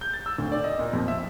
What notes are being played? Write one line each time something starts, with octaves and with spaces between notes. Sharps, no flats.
G6
A6
E6
D2
D5
D#5
A#2
F2
E5